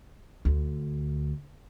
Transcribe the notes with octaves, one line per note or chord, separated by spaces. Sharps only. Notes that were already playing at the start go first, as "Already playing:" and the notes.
D2